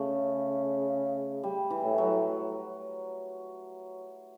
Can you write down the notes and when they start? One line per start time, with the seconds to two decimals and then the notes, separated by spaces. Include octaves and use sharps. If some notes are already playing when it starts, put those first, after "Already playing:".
Already playing: C#3 A3
1.43 G3
1.70 E3
1.84 A2
1.98 F#3